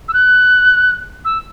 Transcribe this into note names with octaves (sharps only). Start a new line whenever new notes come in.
E6
F#6
E6